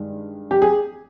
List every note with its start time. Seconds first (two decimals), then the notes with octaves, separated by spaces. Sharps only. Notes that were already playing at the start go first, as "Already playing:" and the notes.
Already playing: G2 D#3 G#3
0.51 G4
0.62 G#4